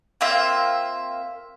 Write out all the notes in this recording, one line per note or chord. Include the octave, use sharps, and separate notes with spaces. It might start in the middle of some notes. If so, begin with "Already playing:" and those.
A#3 C4 F4 E5